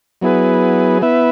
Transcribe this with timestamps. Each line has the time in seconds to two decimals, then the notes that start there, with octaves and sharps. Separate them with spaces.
0.22 F#3 B3 E4 G#4 B4
1.02 B3 E4 B4 E5